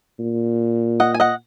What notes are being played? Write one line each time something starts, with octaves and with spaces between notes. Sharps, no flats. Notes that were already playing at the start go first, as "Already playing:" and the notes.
A#2
D#5 F#5
G#5
D#5 F#5